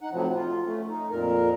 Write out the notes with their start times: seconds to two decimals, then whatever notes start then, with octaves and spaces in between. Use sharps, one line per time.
0.01 D#4 F#5
0.12 A2 C3 F3 F#3
0.35 F4
0.66 A3 C#4
0.89 D#4
1.11 F2 A#2 A#4